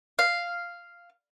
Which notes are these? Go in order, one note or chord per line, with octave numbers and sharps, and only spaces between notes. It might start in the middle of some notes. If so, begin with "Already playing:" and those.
F5